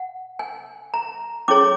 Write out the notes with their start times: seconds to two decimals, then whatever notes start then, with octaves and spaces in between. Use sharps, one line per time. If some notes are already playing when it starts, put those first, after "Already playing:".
Already playing: F#5
0.39 G#5
0.94 A#5
1.48 C#4 E4 G#4 C#5 D6